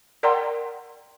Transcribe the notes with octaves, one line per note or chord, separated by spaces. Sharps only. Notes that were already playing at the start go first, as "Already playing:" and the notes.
A#4 D5 F#5 G5 A#5 C6